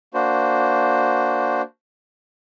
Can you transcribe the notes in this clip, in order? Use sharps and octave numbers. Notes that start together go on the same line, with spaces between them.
A#3 D4 F#4 C5